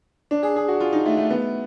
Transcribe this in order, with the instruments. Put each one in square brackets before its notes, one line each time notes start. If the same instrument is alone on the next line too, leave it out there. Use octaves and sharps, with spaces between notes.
[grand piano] D4
G#4
G#4
F#4
F4
D#4
A3
A3
B3